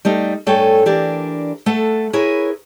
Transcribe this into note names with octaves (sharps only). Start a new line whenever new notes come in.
G3 A3 D#4
G2 A3 A4 C#5 G5 G#5
E3 D4 G4 A#4 D5
A3 A4 F#5
E4 G#4 A#4 B4 C#5